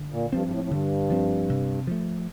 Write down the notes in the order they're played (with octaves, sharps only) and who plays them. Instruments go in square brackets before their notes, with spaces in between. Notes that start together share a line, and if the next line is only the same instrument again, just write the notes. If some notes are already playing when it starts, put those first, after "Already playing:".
Already playing: [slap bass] D3
[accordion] A#2
[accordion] G2 [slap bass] F3 C4
[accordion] G2
A2
A2
[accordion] G2 [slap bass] D3
[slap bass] F3 C4
C3
F3 A3